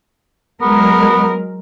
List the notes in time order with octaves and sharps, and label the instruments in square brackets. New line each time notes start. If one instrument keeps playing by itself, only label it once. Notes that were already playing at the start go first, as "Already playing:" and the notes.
[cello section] F#3 G#3 A#4 [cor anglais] B3